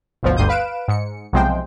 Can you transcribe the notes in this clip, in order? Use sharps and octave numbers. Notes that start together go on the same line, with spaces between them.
G#1 D2 B2 F3
G1 D2 G2 C6 D#6 G6
B4 F5 D7 E7
G#2 C#7
B1 C3 F3 G#3 C5 G5